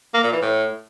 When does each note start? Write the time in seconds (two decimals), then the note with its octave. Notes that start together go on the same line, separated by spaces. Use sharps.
0.14 A#3
0.23 A#2
0.33 E3
0.42 A2